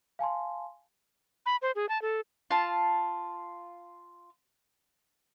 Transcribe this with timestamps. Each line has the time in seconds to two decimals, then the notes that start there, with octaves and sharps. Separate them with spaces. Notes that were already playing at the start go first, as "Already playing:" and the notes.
0.19 F5 G#5 A5 C6
1.46 B5
1.62 C5
1.76 G#4
1.89 A5
2.02 A4
2.51 F4 A5